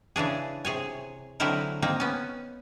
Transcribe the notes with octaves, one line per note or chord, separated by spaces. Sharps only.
C#3 E3 D4 G#4
C3 G#4 C#5 G#5
D3 F#3 C4 D#4 E4 A#4
A#3 C4 D#4
B3 C#4